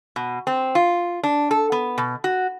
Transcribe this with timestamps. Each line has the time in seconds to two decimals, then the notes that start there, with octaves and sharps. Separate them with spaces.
0.16 B2
0.47 C4
0.75 F4
1.23 D4
1.51 A4
1.72 B3
1.98 B2
2.24 F#4